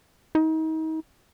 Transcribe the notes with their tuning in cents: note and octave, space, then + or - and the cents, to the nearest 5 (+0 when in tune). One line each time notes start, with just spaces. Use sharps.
D#4 +35